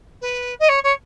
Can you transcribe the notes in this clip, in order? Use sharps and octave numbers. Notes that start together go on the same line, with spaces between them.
B4
D#5
C#5
C#5